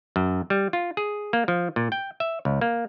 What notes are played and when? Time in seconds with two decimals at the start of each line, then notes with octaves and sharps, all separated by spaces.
0.16 F#2
0.50 G3
0.73 F4
0.97 G#4
1.33 A#3
1.48 F3
1.76 A#2
1.92 G5
2.20 E5
2.45 C#2
2.61 A#3